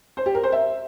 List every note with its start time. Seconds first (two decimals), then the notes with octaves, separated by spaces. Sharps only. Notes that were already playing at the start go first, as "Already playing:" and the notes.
0.17 C5
0.26 G4
0.35 A#4
0.43 C5
0.52 E5